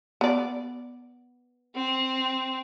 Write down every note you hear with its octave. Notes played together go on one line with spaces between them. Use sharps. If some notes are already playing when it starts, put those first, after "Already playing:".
B3 D5
C4